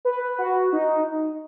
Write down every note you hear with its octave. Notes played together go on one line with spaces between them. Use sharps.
B4
F#4
D#4